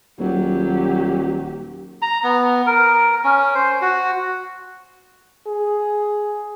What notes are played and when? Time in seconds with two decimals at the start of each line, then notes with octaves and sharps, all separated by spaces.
0.19 D#1 F#3 G4
2.02 A#5
2.23 B3
2.67 A#4
3.24 C#4
3.55 C5
3.82 F#4
5.47 G#4